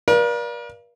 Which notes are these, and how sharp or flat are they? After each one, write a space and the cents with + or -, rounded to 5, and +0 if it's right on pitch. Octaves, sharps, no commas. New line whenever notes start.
A#4 +45 D5 +0 F5 -30